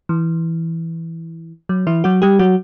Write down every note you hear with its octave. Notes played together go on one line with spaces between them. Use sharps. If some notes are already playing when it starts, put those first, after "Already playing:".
E3
F#3
E3 E4
F#3 F#4
G3 G4
F#3 F#4